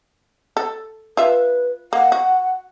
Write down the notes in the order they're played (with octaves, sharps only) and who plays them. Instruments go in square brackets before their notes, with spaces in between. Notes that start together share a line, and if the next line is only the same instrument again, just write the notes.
[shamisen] A4
[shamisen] F4 E5 [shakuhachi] B4
[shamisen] A#3 [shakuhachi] F#5
[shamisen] F#4